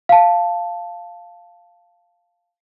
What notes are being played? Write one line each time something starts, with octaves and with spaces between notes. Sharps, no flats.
F5 A5